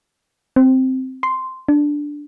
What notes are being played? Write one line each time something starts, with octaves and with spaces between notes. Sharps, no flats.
C4
C6
D4